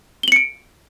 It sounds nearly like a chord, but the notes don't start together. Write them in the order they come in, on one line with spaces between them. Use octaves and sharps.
G7 F#7 C#7 D7